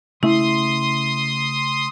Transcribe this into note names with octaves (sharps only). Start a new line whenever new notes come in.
C#3 A3 E4 E5 C6 D#6